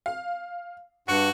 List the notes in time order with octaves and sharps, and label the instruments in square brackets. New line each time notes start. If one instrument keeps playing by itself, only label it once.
[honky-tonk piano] F5
[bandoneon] G2 [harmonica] F#4 [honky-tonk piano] C#7